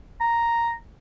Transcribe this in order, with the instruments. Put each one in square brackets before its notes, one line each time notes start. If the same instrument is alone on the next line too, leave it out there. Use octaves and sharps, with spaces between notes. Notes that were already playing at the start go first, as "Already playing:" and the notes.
[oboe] A#5